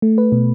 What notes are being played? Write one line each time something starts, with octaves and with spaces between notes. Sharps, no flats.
A3
B4
B2